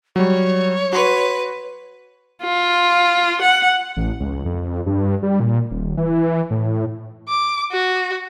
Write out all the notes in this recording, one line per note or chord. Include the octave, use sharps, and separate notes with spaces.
F#3 G3 C#5
F#4 B4 C6
F4
F#5
A1
C#2
F2
G2
G3
A#2
D#1
E3
A2
D6
F#4